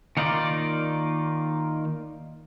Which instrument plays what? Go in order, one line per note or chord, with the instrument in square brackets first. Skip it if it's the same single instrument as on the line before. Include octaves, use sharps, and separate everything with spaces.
[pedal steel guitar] D#3 A#3 D#4 F4 D5